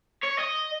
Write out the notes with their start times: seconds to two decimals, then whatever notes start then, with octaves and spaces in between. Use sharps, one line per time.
0.23 C#5
0.39 D#5